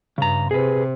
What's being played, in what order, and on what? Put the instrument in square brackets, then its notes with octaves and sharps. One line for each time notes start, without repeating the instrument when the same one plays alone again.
[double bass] G2 [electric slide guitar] C#3 A#5
[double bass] C3 [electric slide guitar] G#4 B4